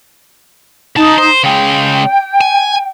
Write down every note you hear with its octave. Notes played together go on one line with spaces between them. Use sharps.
C#3 D#4 A5
C5
C#3 G#3 G5
G#5